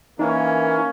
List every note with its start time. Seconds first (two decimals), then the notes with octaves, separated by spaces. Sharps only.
0.19 E3 A#3 C#4 D#4